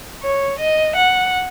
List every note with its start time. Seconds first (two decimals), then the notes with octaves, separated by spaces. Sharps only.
0.21 C#5
0.58 D#5
0.96 F#5